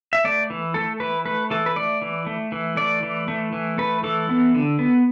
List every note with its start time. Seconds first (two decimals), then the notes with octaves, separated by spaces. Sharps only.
0.13 E5
0.24 A3 D5
0.50 E3
0.74 A3 A4
1.00 E3 B4
1.25 A3 B4
1.51 E3 A4
1.66 B4
1.76 A3 D5
2.02 E3
2.26 A3
2.52 E3
2.77 A3 D5
3.03 E3
3.28 A3
3.53 E3
3.78 A3 B4
4.04 E3 A4
4.29 B3
4.55 D3
4.79 B3